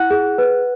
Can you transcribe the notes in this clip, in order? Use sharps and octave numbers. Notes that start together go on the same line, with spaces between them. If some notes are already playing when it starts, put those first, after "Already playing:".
Already playing: E4 F#5 F#6
G#4
B4